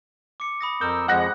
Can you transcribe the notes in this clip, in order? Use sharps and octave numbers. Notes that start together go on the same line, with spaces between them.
D6 C#7
B5 D#6 A#6
F2 A#4 D#6 E6 G6
F2 F3 G#3 F#5 F#6 A#6